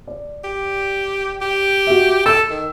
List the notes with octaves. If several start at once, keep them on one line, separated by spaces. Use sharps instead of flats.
D5
G4
G4
F#4 E5
A4 E6
D#3